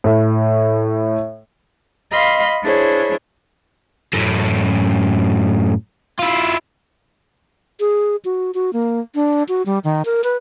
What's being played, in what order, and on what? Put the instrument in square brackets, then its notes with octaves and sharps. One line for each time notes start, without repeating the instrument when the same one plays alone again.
[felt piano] A2
[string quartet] D#5 F5 B5 C6 F6
D4 E4 G#4 C5 C#5
[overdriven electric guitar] F#2 A2
E4 F4
[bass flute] G#4
F#4
F#4
A#3
D4
F#4
G3
D#3
A#4
B4